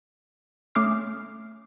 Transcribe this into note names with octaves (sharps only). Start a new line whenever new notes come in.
A3 C#4 D6 D#6 F6 C7